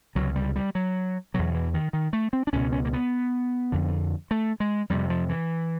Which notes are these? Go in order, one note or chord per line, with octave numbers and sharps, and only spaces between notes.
C#2 C3 F#3
G3
G3
F#3
E2 B2 F#3
E3
D#3
D#3
A3
C4
D4
C#2 B2 C#4
C#4
A#3
B3
F2 D3
A3
G#3
F2 C3 G3
F3
E3